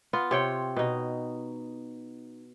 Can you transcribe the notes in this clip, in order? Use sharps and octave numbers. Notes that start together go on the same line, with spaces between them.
B3 F4
C3 C#5 G5
B2 D#4